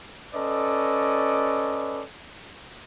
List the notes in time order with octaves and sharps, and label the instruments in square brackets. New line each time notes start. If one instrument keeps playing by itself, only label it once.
[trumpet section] C#4 A4 B4 D5 D#5